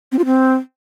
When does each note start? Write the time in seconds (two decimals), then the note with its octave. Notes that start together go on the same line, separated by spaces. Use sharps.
0.12 C4
0.19 F4
0.25 C4